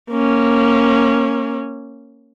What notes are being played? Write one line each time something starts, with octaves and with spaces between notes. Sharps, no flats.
A#3 C#4